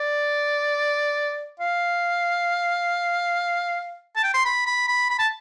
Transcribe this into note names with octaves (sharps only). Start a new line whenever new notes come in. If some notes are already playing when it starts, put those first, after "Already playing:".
Already playing: D5
F5
A5
G5
C6
B5
B5
B5
B5
A5